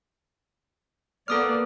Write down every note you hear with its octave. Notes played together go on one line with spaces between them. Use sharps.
A#3 B3 A4 D5 D#6 F6